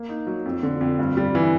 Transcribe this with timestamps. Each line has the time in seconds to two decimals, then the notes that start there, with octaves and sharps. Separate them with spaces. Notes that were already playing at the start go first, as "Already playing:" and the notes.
Already playing: A#3
0.09 D#4
0.27 F#3
0.45 F2
0.63 D3
0.81 F2
0.99 G2
1.17 G3
1.35 E3